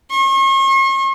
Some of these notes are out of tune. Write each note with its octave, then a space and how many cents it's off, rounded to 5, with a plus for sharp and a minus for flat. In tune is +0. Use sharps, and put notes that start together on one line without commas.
C#6 -45